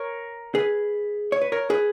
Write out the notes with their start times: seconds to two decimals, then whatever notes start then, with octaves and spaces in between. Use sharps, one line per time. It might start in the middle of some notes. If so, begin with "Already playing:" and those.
Already playing: A#4 C#5
0.55 G#4 B4
1.32 C#5
1.42 B4
1.52 A#4 C#5
1.70 G#4 B4